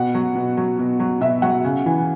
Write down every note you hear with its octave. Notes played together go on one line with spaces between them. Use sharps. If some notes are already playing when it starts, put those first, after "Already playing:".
Already playing: B2 F#5
F#3
B2
F#3
B2
F#3
B2 E5
F#3 F#5
C#3
E3